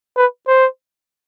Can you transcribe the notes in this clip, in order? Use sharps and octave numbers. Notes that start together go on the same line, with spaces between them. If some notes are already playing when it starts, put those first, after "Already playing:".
B4
C5